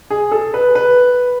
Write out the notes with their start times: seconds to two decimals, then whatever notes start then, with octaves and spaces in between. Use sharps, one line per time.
0.11 G#4
0.32 A4
0.54 B4
0.75 B4